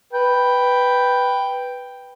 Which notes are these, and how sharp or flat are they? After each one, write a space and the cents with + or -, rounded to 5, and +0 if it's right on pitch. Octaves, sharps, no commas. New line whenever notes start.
B4 +0 G5 +0